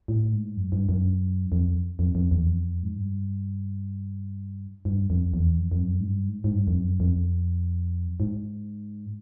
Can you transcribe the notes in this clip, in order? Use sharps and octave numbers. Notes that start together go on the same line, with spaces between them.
A2
G#2
F#2
G2
F#2
F2
F2
F2
E2
F2
G#2
G2
G2
F2
E2
F2
F2
F#2
G#2
G2
G#2
G#2
G2
F2
F#2
F2
G#2